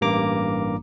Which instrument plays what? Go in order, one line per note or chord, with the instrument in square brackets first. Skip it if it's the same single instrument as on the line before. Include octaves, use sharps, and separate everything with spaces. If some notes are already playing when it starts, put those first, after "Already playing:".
[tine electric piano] A1 G2 A#3 A#5 D6